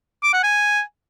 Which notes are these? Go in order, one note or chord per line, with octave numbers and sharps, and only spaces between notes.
D6
F#5
G#5